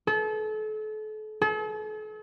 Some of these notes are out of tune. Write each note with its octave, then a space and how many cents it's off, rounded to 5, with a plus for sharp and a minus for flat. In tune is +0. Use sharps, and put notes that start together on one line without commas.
A4 -35
A4 -45